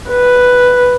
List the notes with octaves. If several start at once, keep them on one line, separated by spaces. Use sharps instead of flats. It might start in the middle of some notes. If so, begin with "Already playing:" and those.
B4